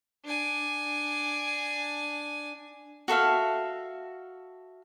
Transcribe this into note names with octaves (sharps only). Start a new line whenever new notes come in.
D4 G#5
F#4 A4 E5 F5